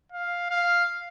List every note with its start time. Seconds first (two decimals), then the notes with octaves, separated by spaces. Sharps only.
0.12 F5
0.50 F5